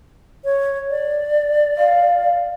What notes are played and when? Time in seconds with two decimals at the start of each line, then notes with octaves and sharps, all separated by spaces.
0.45 C#5
0.90 D5
1.78 F5